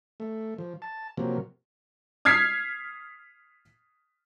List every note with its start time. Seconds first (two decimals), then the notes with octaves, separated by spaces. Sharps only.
0.20 A3
0.58 F3
0.82 A5
1.17 C3 F3 F#3 A#3
2.25 D#6 F6 G#6 B6 C7